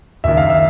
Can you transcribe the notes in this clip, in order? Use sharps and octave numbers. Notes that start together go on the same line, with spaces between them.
F#1 F#2 D#3 E5
F5
E5